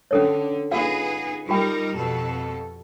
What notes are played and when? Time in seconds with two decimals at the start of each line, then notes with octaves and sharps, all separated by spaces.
0.11 D3 C#4 A4 C#5
0.71 B3 D#4 F4 G#4 F5 F#5
1.49 G3 D#4 F4 G4 A#4 G5
1.96 F2 B2 A4